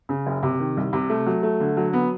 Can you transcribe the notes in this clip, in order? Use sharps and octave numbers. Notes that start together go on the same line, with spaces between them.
C#3
F#1
C3
D#3
C2
C3
A3
F#3
A3
D3
F#3
B3